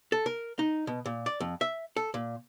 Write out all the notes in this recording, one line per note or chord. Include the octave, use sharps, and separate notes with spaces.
A4
A#4
D#4
B2
A#2
D5
F2
E5
A4
A#2